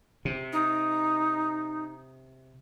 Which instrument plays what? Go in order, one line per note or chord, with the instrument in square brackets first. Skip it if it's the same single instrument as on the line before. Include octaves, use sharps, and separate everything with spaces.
[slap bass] C3
[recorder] D#4